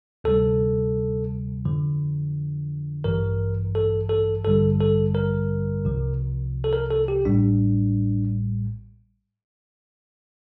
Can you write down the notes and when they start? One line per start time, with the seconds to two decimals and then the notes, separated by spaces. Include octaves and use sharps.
0.24 D2 C3 G3 A4
1.65 F2 D3 F3
3.04 A1 G2 E3 A#4
3.75 A4
4.09 A4
4.44 A1 G2 D3 G3 A4
4.80 A4
5.15 A#4
5.85 C2 C3 F3
6.64 A4
6.73 A#4
6.91 A4
7.08 G4
7.25 A1 A2 G3 D4